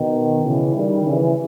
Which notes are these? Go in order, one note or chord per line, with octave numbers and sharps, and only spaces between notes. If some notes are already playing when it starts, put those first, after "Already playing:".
Already playing: B2 D#3
C#3 E3
D#3 G3
C#3 E3